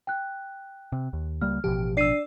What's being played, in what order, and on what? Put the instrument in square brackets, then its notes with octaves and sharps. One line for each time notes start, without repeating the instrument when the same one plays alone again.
[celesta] G5 F#6
[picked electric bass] C3
D#2
[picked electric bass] C#2 G3 A#3 [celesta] F6
[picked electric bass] A1 B2 F3 [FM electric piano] G4
[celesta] D4 C7 D#7 [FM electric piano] D5 E6